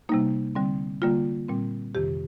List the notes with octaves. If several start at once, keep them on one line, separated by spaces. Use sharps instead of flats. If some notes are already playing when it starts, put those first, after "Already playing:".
C3 G3 A#3 D#4
D3 G3 C4
D3 G3 A#3 F4
A#2 G3 C4
F2 C3 D#3 G4